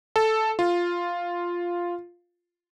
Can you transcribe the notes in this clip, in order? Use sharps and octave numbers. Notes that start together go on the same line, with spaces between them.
A4
F4